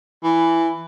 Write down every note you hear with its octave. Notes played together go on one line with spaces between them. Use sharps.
E3